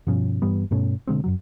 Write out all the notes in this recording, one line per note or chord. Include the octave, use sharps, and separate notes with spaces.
G2 B2 F3 C#4
G2 E3 G3 B3
G2 B2 A3 C#4
B2 D3 G#3 C4
F#2 A#2 F#3